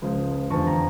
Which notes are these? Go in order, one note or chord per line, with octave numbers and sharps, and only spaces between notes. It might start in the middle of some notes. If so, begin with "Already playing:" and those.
C#2 C#3 F3
F1 E2 D3 F3 A5 C#6
G5 A#5